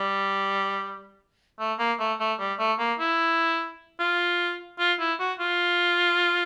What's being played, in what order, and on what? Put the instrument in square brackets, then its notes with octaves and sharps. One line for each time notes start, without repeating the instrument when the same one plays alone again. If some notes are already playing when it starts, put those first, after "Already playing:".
Already playing: [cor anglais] G3
A3
A#3
A3
A3
G3
A3
A#3
E4
F4
F4
E4
F#4
F4